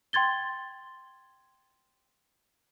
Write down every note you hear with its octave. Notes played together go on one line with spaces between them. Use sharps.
G5 C6 G#6 A6 G7